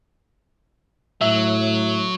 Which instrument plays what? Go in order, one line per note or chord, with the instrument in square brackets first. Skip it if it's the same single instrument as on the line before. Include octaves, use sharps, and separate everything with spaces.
[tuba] A2 [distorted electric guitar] F#3 [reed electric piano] E5